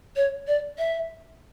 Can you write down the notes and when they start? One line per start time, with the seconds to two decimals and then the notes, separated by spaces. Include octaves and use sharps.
0.16 C#5
0.47 D5
0.78 E5